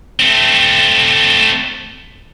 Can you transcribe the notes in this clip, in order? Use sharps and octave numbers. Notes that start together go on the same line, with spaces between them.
A3 C4